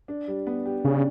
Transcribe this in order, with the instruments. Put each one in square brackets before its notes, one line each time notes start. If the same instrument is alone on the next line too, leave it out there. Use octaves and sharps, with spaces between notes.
[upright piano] D4
G3
B3
G4
[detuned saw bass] C#3 [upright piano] D4